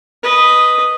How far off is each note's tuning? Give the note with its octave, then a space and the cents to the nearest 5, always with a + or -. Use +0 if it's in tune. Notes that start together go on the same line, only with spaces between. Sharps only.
B4 +0 D#5 +0